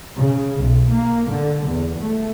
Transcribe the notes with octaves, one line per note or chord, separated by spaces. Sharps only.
C#3
B1
A#3
D3
E2
A3